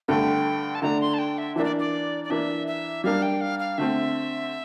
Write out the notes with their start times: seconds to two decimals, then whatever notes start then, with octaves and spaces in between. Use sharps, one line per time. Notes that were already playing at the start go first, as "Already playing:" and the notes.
0.08 G2 D3 A3 G5
0.75 A5
0.82 D3 A3 D4 A#5
1.01 C6
1.14 A5
1.19 G5
1.38 E5
1.56 E3 A#3 D4 E5
1.65 D5
1.79 D5
2.24 D5
2.30 E3 A#3 D4 E5
2.67 E5
3.04 G3 A#3 D4 F5
3.22 G5
3.41 F5
3.59 F5
3.78 D3 A3 C4 E5